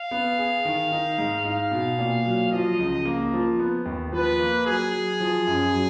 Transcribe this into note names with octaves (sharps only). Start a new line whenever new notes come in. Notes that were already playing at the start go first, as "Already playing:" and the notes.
Already playing: F5
B3
G#4
D#3
D#4
G#2
D#4 F5
B2
A#2
F#3
F3 D#5
C#2
A#3
F3
B3
D#2
F3 B4
A#3
F#3 G#4
F#3
F3
F#2
F#3